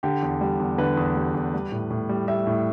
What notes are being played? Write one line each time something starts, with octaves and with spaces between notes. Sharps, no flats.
D3 G4
E2
G3
E2
D3 B4
E2
G3
E2
G3
A2
A2
G3
G3 E5
A2